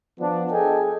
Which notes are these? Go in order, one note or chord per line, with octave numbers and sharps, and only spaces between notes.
F3 B3 D4
G#4 A4 D#5 G5 G#5